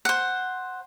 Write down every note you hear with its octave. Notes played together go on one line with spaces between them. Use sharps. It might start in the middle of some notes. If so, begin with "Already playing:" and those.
C5 F#5